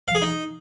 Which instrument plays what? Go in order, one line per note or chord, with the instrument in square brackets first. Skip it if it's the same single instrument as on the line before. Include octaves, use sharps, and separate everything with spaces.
[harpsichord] F5
G#4
D#4